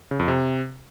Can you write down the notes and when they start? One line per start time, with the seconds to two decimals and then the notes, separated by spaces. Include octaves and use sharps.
0.11 C#3
0.19 F2
0.28 C3